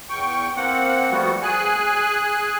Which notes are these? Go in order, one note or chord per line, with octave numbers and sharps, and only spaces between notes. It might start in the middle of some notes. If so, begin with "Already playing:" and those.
E2 G5 C#6
A#3 C4 F#5
F3 G3 A3 B3 F#4
G#4 G#5 F#6